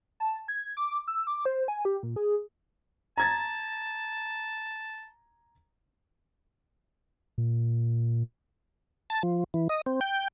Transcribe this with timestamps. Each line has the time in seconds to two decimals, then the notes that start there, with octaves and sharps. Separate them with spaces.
0.20 A5
0.48 G#6
0.77 D6
1.08 E6
1.27 D6
1.45 C5
1.68 G#5
1.85 G4
2.03 A#2
2.16 G#4
3.18 A5 A#5 G#6 A6
7.38 A#2
9.10 A5
9.23 F3
9.54 E3
9.69 D#5
9.86 C4
10.01 G5